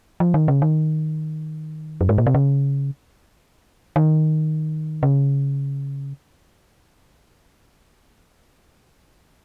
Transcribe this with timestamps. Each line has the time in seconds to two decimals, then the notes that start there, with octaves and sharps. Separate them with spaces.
0.20 F3
0.34 D#3
0.48 C#3
0.62 D#3
2.01 F#2
2.09 G#2
2.18 A#2
2.27 C3
2.35 C#3
3.96 D#3
5.03 C#3